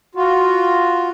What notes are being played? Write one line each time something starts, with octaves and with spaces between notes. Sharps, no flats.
F4 F#4